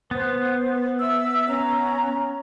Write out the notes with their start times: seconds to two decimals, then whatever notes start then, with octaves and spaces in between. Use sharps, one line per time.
0.11 B3 C5
1.00 E5 E6
1.48 C#4 A#5